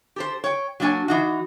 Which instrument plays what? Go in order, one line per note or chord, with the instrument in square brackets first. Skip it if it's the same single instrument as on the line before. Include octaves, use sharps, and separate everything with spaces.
[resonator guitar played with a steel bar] G4 A4 C5
C#5 G5
F#3 A3 A#3 D4 C#5 G#5
E3 D#4 F#4